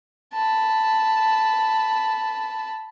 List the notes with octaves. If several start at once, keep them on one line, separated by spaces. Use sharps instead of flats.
A5 B5